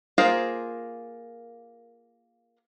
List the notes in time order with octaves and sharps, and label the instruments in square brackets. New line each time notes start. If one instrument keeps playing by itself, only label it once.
[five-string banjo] A#3 F4 G#4 A#4 C5